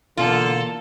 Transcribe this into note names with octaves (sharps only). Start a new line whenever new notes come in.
B2 D3 E3 A#3 F4 A4